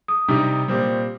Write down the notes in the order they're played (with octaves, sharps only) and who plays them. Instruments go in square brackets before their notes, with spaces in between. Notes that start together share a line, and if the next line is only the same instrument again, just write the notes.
[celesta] D#6
[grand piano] C3 G3 D#4 G4
A#2 G3 C4